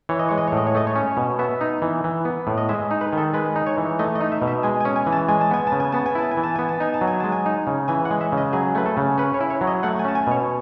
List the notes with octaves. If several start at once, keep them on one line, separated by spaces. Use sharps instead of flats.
E3 C#5
D#5
G#3 C#5
D#5
C#5
A2 D#5
C#5
A3 D#5
C#5
C#4
B2
B3 E5
D#4
E3
E3
B3
A2
D#5
G#3 E5
D#4
B4
D#3 A4
G#3 B4
D#4
C#5
E3
A3 D#5
D#5
D#4
E5
B2
E5
G#3 G#5
G#5
C#4
G#5
E3
A5
G#3 G#5
A5
B3 G#5
A5
C#3
G#5
B3 A5
G#5
E4 A5
G#5
E3
A5
B3 G#5
A5
D#4 G#5
A5
F#3
G#5
G#3 A5
G#5
D#4
C#3
E3 G#5
F#5
G#3
E5
C#3
D#5
F#3 G#4
A3 B4
A4
C#3
C#4 B4
C#5
E4
C#5
F#3
D#5
A3 F#5
G#5
C#4 A5
G#5
B2 C#5